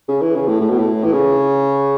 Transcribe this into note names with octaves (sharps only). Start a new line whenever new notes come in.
C#3
E3
C#3
A2
A2
B2
A2
E3
C#3